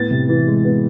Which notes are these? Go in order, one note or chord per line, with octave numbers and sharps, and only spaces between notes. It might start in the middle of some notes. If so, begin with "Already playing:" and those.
Already playing: A2 B3 A6
C3
E3
G#3
B3